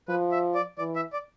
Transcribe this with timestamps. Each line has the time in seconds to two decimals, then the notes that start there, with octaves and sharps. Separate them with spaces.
0.08 F3 B4
0.32 E5
0.55 D5
0.78 E3 D5
0.96 E5
1.13 D5